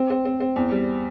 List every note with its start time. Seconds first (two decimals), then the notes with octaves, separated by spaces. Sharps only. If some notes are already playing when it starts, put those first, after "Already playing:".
Already playing: C4
0.10 C4
0.25 C4
0.40 C4
0.56 E2
0.71 G3